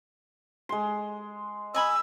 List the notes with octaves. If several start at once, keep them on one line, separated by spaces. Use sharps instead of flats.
G#3 C6
D#5 G#5 B5 E6